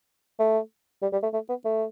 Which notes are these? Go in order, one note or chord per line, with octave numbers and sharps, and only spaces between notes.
A3
G3
G3
A3
A3
B3
A3